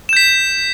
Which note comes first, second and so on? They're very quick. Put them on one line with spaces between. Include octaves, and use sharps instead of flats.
E7 G6 B6